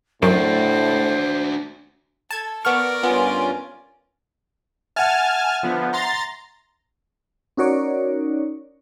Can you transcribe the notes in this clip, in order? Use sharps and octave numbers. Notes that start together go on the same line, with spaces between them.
F#2 A2 D4 F#4 C5
A4 A5 G#6
B3 A#4 D5 C#6 F6
G2 B3 C#4 F4
E5 F#5 G#5 A5 F6
D3 F3 B3
A#5 C6 A6
C#4 D#4 F#4 A#4 C#5 D5